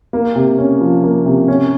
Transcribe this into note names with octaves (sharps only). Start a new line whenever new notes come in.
A#3
C3
C#4
F3
A#3
C3
C#4